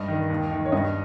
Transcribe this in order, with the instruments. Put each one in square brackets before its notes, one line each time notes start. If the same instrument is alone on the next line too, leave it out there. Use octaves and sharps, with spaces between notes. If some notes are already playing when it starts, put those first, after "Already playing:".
Already playing: [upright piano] G2 D#5
D#3
D#2
D#3
C#5
G2 D#5